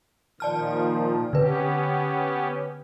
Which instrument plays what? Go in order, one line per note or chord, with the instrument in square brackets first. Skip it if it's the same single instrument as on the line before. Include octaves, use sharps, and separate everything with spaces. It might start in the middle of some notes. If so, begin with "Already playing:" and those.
[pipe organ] A#2 D#3 F3 [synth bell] D5 A5 F6
[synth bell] D3 B4 [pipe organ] B3 C#4 G4